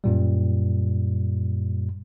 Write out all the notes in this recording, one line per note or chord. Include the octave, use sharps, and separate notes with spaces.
F#2 A#2 G3